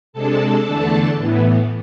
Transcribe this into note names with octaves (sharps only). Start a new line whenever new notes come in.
C3 G#3 D4 A4 A5
E2 D3 A3 D4
A2 E3 B3